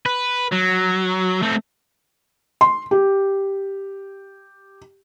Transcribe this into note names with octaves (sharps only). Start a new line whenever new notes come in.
B4
F#3
A3 C4
C6
G4